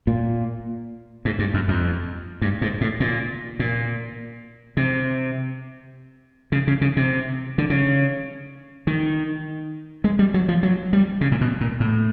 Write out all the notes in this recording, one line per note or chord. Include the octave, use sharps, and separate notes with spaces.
A#2
G#2
G2
F#2
F2
G2
G#2
A2
A#2
A#2
C3
C#3
C#3
C#3
C3
D3
C#3
D#3
G#3
G3
F#3
F3
F#3
G3
C#3
A#2
B2
A#2
A2